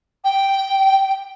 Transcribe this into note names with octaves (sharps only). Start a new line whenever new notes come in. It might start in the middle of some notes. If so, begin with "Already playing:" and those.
G5